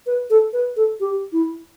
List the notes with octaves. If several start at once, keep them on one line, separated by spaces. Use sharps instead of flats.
B4
A4
B4
A4
G4
E4